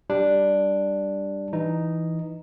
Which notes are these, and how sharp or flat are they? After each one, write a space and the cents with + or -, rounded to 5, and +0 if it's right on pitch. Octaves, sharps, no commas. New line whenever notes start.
G3 +0 D4 +0
E3 +0 D#4 +0